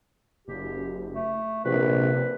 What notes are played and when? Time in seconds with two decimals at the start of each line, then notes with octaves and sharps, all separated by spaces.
0.48 F#1 G4
1.14 A3
1.65 A#1 C3 B4